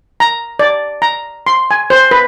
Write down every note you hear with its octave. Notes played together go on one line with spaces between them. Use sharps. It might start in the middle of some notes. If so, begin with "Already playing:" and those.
A#5
D5
A#5
C6
G#5
C5
B4